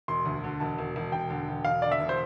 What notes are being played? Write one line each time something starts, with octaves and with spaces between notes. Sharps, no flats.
E1 C6
D2
D3
E1 A5
E1
E1
E1 G5
D3
E1
E1 F5
D3 D5
E5
E1
C5